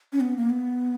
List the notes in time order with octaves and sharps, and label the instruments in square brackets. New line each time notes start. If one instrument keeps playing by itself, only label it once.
[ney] C#4
B3
A#3
B3